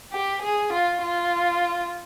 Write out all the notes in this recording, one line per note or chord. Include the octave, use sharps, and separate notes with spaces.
G4
G#4
F4
F4